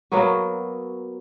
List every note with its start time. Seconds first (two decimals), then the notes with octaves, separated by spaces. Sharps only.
0.12 F#3 A#3 B3 F#4